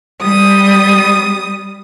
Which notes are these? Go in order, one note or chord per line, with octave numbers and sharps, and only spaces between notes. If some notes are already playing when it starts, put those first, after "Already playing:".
G3 D#6